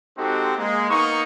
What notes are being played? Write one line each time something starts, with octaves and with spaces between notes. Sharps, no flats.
G#3 C4 D#4 F#4 G4 A4
G#3 A#3
A#3 B3 D#4 C#6